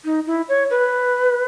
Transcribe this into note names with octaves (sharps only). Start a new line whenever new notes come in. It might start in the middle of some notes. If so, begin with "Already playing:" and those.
D#4
E4
C#5
B4